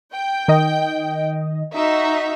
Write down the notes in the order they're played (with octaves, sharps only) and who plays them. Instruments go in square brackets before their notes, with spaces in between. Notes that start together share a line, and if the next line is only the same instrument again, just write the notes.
[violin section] G5
[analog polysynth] D#3 D#5
[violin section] D#4 F#4 E5